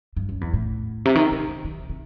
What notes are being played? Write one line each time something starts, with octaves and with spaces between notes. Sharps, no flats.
G2
F#2
E2
A2
C3
D#3
C3
D#3
D#3
C3